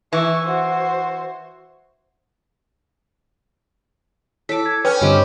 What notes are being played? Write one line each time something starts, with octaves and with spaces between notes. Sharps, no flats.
E3 E5 C#6
F#4 C5
E4 A4 C#5 D6 B6
G#6
C#4 B4 C#5 G5 G#5
G2 D3 C4 G4 B4 C#5 D#5